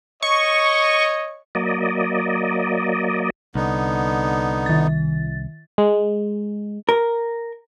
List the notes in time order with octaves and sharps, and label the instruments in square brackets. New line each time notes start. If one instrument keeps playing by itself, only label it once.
[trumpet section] C#5 D#5 [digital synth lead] C#6
[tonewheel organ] F#3 A#3 D5 D#5
[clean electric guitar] C2 [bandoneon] D3 B3 D#4
[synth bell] D#3 A6
[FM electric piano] G#3
[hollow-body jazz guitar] A#4